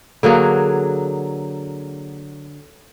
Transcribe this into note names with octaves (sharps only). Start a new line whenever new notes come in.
D3 F#3 A#3 G#4